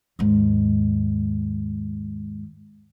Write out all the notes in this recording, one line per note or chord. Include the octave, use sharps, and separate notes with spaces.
D#2 G#2